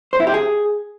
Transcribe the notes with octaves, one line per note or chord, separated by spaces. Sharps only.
C5
E4
G4
G#4